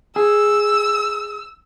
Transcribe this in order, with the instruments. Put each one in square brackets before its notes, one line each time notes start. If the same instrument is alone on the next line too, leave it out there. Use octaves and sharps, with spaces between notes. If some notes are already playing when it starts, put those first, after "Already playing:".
[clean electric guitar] G#4 [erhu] E6